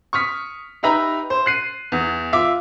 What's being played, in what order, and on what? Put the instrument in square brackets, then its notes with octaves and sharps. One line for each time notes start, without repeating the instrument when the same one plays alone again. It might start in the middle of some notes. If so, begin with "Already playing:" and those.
[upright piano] C#6 D#6 F6 B6
D#4 G4 B4 E5 A#5 B5
C5
F#6 C7 D#7
E2
F4 E5 D6